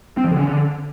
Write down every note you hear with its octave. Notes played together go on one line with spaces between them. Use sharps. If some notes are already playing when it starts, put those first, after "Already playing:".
C4
F3
D3
C#4
D3